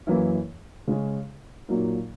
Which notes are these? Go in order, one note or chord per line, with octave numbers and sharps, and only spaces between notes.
F#2 E3 A#3 E4
C#3 G#3 C#4
A#2 F#3 A#3 D#4